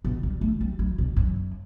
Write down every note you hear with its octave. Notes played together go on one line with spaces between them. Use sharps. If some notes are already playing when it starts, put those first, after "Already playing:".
B2
G3
A3
G3
F#3
B2
F#2